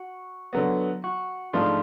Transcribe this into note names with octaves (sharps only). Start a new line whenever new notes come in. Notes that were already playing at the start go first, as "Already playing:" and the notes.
Already playing: F#4
D3 F#3 B3
F#4
G#2 F3 A3 D4 F4